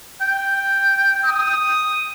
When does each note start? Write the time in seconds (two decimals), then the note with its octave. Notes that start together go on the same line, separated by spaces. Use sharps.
0.21 G5
1.26 D#6